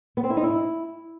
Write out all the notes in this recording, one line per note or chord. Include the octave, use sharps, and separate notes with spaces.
B3
C4
E4
D#4
E4